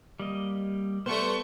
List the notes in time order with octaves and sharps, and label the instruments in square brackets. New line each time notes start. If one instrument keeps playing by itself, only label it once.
[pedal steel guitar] G3 A#3 D#5
[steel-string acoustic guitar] G3 B3 [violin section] A3 C#6 G6 [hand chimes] B4 [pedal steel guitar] C5